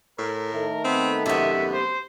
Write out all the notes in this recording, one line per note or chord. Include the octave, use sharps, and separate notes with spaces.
A2 A#4
D#3 A3
B3 C4
F#2 C3 B3 E5
C5